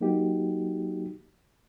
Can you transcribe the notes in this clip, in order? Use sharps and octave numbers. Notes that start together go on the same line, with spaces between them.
F#3 A#3 D#4 F#4 G4